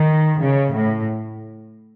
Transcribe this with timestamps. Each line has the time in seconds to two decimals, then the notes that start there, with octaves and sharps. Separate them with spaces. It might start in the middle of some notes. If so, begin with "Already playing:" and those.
Already playing: D#3
0.41 C#3
0.73 A2